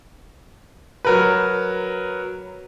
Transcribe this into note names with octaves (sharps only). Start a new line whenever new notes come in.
F#3 A#4 B4